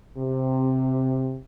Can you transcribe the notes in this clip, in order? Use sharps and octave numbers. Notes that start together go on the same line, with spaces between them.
C3